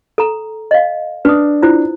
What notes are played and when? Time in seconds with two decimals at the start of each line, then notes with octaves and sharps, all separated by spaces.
0.18 A4 A#5
0.71 D#5 F5
1.25 D4 B4 D#6
1.62 E4 F4 C5